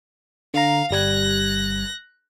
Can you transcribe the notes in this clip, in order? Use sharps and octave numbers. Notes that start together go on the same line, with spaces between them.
D3 F5 A#5
G1 G3 F#6 G#6 A#6